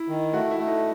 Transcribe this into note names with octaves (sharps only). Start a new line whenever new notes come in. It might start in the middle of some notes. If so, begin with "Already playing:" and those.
Already playing: E4
D#3
A3 F#4
E4
A3
D#4